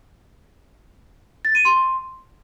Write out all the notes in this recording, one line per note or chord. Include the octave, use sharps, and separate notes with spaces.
A6
D#7
C6